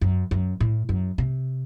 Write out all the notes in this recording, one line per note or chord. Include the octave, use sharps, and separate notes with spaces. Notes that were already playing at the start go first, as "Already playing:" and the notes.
F#2
F#2
A2
F#2
C3